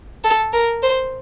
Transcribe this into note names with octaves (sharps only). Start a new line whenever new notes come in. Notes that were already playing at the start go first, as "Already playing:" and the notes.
A4
A#4
C5